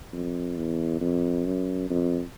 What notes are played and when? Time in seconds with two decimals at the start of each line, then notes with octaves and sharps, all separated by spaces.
0.13 F2
0.57 E2
1.01 F2
1.45 F#2
1.90 F2